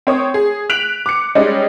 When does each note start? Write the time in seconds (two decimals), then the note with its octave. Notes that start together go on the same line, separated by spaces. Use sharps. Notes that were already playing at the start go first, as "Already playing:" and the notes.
0.07 C4 C#5 D#6
0.34 G#4
0.70 F#6 B6 D7 F7 F#7
1.06 D6 C#7
1.35 G3 G#3 C#4 D#4 D5 D#5